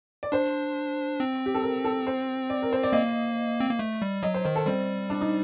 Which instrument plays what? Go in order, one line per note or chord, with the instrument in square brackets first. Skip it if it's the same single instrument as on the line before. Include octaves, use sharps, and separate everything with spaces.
[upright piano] D5
[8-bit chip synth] D4 [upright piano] C5
[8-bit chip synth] C4
[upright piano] G4
A4
A#4
A4
C5
D5
A#4
C5
D5
[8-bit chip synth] A#3 [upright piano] D#5
[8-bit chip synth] C4
A#3
A3
G3
[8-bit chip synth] F#3 [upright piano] D#5
[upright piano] C5
[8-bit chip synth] D#3 [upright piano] C5
[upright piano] A4
[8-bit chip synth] G3 [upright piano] C4
[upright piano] D4
D#4